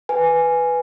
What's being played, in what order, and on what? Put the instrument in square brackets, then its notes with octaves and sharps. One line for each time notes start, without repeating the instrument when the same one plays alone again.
[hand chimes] B4 G#5